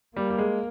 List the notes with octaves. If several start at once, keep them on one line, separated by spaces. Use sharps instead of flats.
G3 A#3
G3
G#3